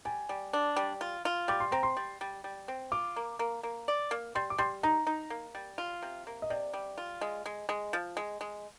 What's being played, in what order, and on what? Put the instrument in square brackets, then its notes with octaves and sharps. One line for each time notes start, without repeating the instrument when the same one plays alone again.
[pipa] G3 [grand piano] G#5
[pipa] G3
D4
G3
F4
F4
[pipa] G3 [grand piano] D6
[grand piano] C6
[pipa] C4 [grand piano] A#5
[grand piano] C6
[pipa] G3
G3
G3
C4
[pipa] F4 [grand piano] D6
[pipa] A#3
A#3
A#3
D5
A#3
[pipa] G3 [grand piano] C6
[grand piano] D6
[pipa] G3 [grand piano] C6
[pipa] D#4 [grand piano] A#5
[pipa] D#4
A#3
G3
F4
C3
A#3
[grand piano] D#5
[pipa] C3 [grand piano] D5
[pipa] G3
F4
G#3
G#3
G#3
F3
G#3
G#3